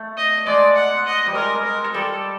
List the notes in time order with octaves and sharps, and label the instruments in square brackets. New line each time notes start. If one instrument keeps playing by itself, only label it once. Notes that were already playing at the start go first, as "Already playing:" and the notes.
Already playing: [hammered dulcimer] A3
[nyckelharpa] D#5
[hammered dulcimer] G#3 [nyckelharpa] D5
[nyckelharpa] F#5
D#5
[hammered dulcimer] G3
[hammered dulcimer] G#3 [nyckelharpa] A#4
[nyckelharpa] A#4
[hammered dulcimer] G3 [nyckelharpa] A4